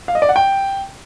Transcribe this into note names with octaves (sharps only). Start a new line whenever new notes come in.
F5
D#5
D5
F#5
G5